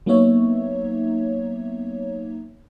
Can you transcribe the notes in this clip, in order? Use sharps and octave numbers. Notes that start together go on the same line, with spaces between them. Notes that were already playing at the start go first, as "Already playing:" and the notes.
F#3 A#3 B3 D#4 C#5 E5